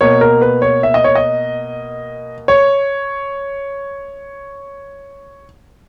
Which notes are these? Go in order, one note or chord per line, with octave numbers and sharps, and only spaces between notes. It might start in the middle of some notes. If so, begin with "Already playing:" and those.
B2 A#3 C#5
A#4
B4
C#5
E5
D#5
C#5
D#5
C#5